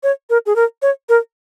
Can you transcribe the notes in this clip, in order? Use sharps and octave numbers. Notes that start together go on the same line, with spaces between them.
C#5
A#4
G#4
A#4
C#5
A#4